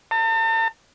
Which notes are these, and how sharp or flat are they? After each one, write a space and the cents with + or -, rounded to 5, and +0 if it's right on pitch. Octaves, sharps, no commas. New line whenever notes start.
A5 +45